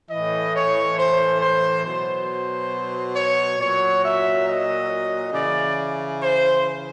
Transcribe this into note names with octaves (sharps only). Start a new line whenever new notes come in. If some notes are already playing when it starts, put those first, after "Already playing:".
A2 E3 D#5
C#5
C5
C5
B2 F#3 C5
C#5
A#2 F#3 C#5
E5
D#5
C#3 E3 D5
C5